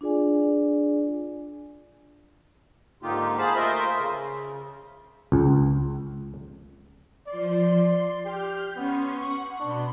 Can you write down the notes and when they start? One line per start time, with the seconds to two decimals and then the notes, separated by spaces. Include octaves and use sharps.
0.01 D4 F4 G#4 D5 G#5
3.03 G#2 D3 A#3 D#4 F4 G4
3.38 G#4 C5 F5 A5 B5
3.56 A3 F4 A#4 C5 D#5 E5
3.98 C#3
5.32 C#2
7.27 F3 D5 C6
7.83 C6
8.26 G4 F6 G6
8.76 B3 C#4 C6 C#6
9.19 F#5 C#6
9.60 B2 D4 B5 C6